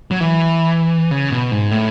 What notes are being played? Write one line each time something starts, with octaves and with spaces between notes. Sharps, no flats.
F#3
E3
C#3
B2
G#2
A2